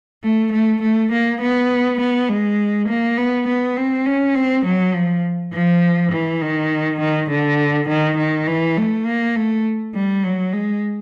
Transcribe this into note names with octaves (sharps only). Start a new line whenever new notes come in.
A3
A3
A3
A#3
B3
B3
G#3
A#3
B3
B3
C4
C#4
C4
F#3
F3
F3
E3
D#3
D#3
D3
D#3
D#3
E3
A3
A#3
A3
G3
F#3
G#3